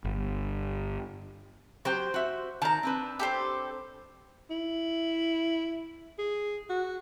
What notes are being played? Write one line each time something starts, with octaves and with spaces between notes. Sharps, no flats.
G1
F#3 G4 C5 G5
F#4 E5
D#3 A5 A#5
C4 D4 B4
G4 A4 C5
E4
G#4
F#4